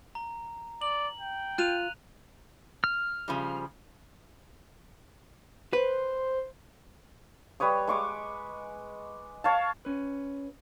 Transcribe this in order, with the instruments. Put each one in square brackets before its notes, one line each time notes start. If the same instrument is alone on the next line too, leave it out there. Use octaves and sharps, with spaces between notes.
[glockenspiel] A#5
[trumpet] D5 [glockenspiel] F#7
[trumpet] G5
[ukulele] F4 [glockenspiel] F#6 D#7 F7
[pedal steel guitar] F6
[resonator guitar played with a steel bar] C#3 F3 G3
[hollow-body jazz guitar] B4 [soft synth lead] C5
[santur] G3 B4 C#5 D#6
G#3 C#6 D6
C#5 F5 A5
[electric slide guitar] C#4 B4